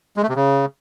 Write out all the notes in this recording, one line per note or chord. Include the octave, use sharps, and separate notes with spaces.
G#3
A3
C3
C#3